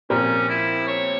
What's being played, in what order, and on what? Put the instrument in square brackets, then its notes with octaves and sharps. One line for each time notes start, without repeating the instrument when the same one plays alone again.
[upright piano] A#2 F3 C4 G4 A#4 [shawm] C#4
[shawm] E4
C#5